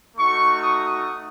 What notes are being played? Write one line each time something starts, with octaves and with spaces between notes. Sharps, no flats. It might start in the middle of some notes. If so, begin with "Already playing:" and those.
A3 D#4 F#4 C#6
D#6